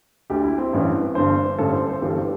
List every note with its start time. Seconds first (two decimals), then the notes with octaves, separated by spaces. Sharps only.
0.30 D2 D3 G4
0.43 E4
0.58 C4
0.73 A1 G2 E3
1.15 G1 G2 D3 C5
1.59 A1 G2 D3 A4
1.73 C5
1.87 C5
2.01 G1 G2 E3 G4
2.10 A4
2.18 G4